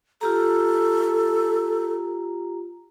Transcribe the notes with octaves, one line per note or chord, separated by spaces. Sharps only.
F4 G4 A4 A#5